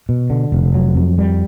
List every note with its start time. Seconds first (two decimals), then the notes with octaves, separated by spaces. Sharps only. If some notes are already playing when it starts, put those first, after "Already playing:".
0.09 B2
0.30 D3
0.52 F1
0.74 F#3
0.95 F2
1.18 G3